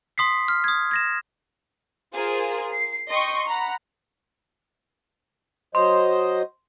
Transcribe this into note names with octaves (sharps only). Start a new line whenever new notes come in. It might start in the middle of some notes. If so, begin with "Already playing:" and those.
C6 D#6 B6 C7
F6
D#6 G#6
G#6 A#6 E7
F4 G#4 A#4 C5
C7
D#5 G5 C6 C#6
F#5 A#5 B5
F#3 C5 D#5 C6